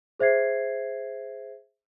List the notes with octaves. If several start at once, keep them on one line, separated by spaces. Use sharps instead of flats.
G#4 C5 E5 G#6 C7